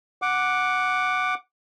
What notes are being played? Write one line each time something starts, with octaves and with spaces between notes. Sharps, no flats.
F#5 D6